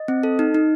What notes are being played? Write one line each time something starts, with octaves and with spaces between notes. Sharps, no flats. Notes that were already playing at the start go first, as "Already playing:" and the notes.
Already playing: D#5
C4
A4
D#4
D#4